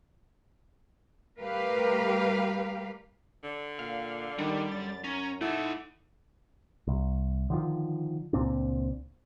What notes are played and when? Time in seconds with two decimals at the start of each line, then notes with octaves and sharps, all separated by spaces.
1.39 G3 A3 G4 A#4 B4 F5
3.44 D3
3.79 A#2 F5
4.38 D#3 G3 D4
4.72 F#2 A6
5.04 C#4 A#5
5.41 A3 D#4 E4 F#5
6.88 C2
7.50 D3 D#3 F3
8.33 C#2 A#2 C4 D4